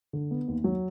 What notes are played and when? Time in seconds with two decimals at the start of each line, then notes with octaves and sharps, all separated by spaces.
0.13 D3
0.31 B3
0.48 D#2
0.64 F#3